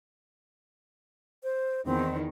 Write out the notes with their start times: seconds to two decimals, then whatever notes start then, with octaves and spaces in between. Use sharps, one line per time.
1.43 C5
1.85 E2 D#3 C4